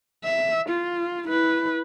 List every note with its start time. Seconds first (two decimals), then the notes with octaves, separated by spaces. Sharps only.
0.24 E5
0.69 F4
1.28 E4 B4